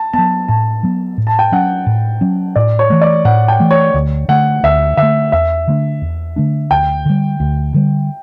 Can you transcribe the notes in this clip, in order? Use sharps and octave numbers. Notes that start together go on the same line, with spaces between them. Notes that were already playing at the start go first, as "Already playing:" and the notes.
Already playing: A5
F#3 B3 A5
A2 A5
F#3 B3
A2
A5
G5
F#3 C#4 F#5
A2
F#3 C#4
A2 D5
C#5
E3 A3
D5
A2 F#5
G5
E3 A3
C#5
D2
D3 A3 F#5
D2 E5
D3 E5
A3
E2 E5
D3 A3 D4
E2
D3 A3 D4
D2 G5
D3 G3
D2
D3 G3